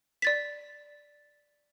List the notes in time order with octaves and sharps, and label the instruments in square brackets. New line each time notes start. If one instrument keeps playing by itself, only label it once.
[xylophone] D5 A6 B6